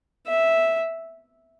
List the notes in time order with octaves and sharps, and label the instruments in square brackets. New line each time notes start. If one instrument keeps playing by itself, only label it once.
[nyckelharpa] E5